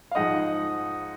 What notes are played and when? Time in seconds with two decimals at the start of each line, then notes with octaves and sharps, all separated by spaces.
0.11 F5
0.15 G#2 F3 G#3 D#4 D#5 F#5